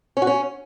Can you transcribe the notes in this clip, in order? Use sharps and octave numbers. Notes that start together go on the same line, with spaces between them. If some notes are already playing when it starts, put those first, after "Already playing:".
C#4
F#4
C#4